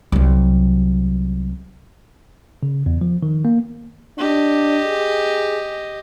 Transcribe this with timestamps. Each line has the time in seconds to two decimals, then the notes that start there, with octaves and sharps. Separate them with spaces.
0.12 C2 F#3
2.63 C#3
2.86 E2
3.01 F3
3.23 D#3
3.45 A#3
4.19 D4 G4 D#5
4.87 G#4